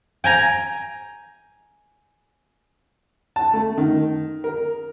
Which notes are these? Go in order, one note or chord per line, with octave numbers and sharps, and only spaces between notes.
G5 G#5 A#5
A5
A3
D#3
A#4